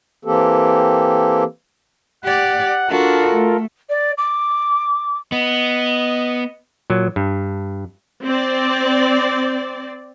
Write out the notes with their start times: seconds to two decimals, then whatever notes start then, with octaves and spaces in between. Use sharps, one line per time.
0.25 E3 A#3 C4 G4 A4
2.24 G4 D5 F#5
2.89 D4 F4 F#4 A4 A#4
3.34 A3
3.89 D5
4.17 D6
5.32 B3 D#5
6.90 A#2 F#3
7.16 G2
8.25 C4 D5